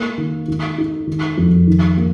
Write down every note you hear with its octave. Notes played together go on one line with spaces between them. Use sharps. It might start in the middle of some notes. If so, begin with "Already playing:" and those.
Already playing: A#3
D#3
D#3
D#4
D#3
F2
D#3
A#3